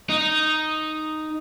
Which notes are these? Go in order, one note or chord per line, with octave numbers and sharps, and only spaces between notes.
D#4